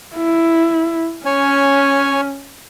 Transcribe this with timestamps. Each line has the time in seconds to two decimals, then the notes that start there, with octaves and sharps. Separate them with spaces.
0.16 E4
1.26 C#4 C#5 G#5